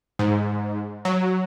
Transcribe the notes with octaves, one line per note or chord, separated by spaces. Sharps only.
G#2
F#3